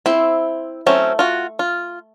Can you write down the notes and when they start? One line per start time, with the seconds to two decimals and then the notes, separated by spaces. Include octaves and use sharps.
0.06 C4 E4 E5 C6
0.86 F#3 A3 C4 C#4
1.19 F4 F#4
1.59 F4